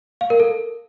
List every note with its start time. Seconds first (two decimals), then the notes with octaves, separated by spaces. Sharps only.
0.21 F5
0.30 A#4
0.40 A4